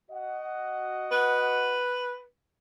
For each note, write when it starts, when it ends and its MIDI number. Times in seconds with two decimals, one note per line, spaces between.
0.11 1.89 66
0.11 1.89 75
0.11 1.89 78
1.12 2.22 71